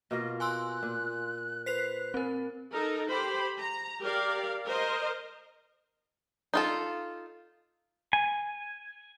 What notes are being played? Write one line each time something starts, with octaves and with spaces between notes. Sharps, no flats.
B2 A#3 F4 D#5
G#5 C6 E6 F#6
A#2
B4 C5 F#6 B6 C7 F7
C4 A#4
D#4 A4 A#4
G4 C5 B5
A#5
G4 A#4 D5 F5
A#4 C5 D#5
D#4 F4 A4
G#5